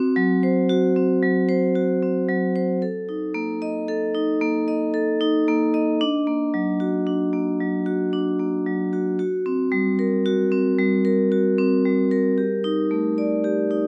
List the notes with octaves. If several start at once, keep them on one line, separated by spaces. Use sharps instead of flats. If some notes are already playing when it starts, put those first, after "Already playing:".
Already playing: C4 F#4
F#3
C5
F#4
C4
F#3
C5
F#4
C4
F#3
C5
A4
D#4
A#3
D#5
A4
D#4
A#3
D#5
A4
D#4
A#3
D#5
D4
A#3
F#3
F#4
D4
A#3
F#3
F#4
D4
A#3
F#3
F#4
F#4
C4
G3
A#4
F#4
C4
G3
A#4
F#4
C4
G3
A#4
G4
D#4
A3
D5
G4
D#4